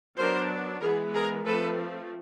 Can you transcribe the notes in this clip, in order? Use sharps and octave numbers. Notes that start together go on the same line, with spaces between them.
F#3 B3 D4 A#4 C5
E3 G#3 B3 G#4 A#4
G#4 A#4
F3 A3 C4 A4 B4